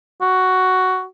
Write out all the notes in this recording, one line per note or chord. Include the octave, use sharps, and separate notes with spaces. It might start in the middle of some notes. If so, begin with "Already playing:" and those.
F#4